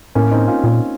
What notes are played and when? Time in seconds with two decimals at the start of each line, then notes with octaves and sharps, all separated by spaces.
0.15 A2 A#3 C#4
0.31 C4 D#4
0.47 C#4 F4
0.64 A#2